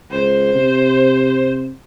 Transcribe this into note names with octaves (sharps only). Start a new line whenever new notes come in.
C#2 C5
C3